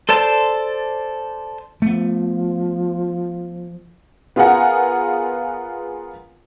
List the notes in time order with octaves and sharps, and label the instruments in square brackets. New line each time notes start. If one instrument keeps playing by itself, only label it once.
[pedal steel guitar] A4 C5 D5 A5 C6
[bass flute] F3 [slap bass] A3 B3
[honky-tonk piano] B3 F4 G#4 A#4 F#5 G#5